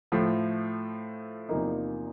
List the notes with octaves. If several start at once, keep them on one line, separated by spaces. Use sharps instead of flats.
A2 F3 A3
E2 C3 F3 A#3 D#4